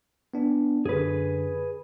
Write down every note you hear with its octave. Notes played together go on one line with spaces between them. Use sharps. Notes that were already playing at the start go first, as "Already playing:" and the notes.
B3 D4
F#2 D3 G#4 B4